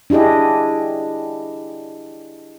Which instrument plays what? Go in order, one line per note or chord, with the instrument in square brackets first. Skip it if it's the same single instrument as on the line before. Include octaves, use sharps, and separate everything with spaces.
[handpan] D4 E4 G4 G#4 D#5